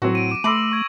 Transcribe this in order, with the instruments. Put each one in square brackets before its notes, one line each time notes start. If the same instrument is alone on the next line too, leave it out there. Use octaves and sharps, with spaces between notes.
[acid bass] A2 [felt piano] F#3 C4 F#4
[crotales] D7 D#7
D6 D#7
[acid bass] A3 [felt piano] B5 C6 D6 [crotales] E6 A#6 F#7
[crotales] C#6 G#6 D7